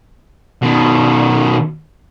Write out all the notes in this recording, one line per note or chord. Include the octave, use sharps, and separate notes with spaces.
B2 D#3